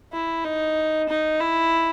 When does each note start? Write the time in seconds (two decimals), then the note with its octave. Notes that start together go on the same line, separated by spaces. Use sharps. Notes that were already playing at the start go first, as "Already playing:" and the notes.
0.13 E4
0.44 D#4
1.09 D#4
1.41 E4